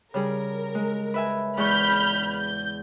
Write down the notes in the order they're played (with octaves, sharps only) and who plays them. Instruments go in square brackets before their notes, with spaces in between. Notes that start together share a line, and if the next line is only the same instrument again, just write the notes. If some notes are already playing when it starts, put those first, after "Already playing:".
[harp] C#3 G3 G#4 [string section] A#4
[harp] G#3
B4 E5 G#5
[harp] E2 G#3 C#6 [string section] B5 F6 G6
[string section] G6